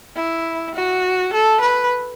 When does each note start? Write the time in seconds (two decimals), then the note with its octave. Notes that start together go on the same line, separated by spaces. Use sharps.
0.16 E4
0.75 F#4
1.33 A4
1.61 B4